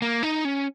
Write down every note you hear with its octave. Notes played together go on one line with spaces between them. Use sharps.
A#3
D#4
C#4